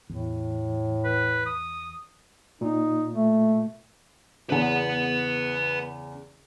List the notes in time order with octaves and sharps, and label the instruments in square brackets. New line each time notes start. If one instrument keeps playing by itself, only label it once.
[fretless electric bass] E2 [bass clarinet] A2
[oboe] B4
D#6
[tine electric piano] A#2 [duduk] D#4
[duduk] A3
[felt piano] E2 C#3 [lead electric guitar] B4 F#5